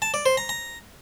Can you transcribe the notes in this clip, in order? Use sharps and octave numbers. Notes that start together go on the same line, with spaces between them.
A5
D5
C5
A#5
A#5